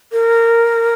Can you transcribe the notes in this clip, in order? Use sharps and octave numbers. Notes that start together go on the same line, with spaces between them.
A#4